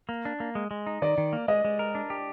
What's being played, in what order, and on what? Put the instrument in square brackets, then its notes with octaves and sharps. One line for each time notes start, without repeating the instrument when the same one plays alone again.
[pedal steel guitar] A#3
D4
A#3
G#3
G#3
D#4
[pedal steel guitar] D#3 [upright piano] D5
[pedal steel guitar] D#3
A#3
[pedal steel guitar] G#3 [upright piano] D#5
[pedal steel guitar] G#3
A#4
D4
G4